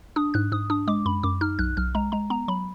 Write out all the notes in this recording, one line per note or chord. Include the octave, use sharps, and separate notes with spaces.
D4 D#6
G#2 F#6
G#2 D#6
D4 D#6
G#3 D6
F#2 B5
F#2 D6
D#4 F6
B1 F#6
B1 F6
G#3 A#5
G#3 A#5
B3 A#5
F#3 B5